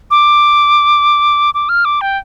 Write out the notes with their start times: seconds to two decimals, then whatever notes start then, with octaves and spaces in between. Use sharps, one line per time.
0.11 D6
1.54 D6
1.69 F6
1.85 D6
2.01 G5